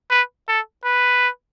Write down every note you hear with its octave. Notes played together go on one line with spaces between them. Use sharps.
B4
A4
B4